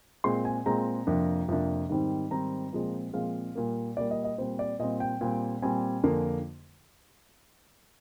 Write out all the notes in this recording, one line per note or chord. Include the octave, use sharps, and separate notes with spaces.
A#2 G#3 C4 C6
G#5
A#2 G#3 C4 A#5
F2 C3 F3 A#3 D4
F2 C3 F3 A#3 D4
G#2 D#3 G3 C4
G#2 D#3 G3 C4 A#5
A#2 F3 G#3 C4
A#2 F3 G#3 C4 F5
A#2 G3 A#3
A#2 G3 A#3 D5
D#5
D#5
A#2 G3 C4 C5
D5
A#2 G3 C4 D#5
G5
A#2 G3 C4
A#2 G3 C4 G#5
F2 D3 F3 A#3 D4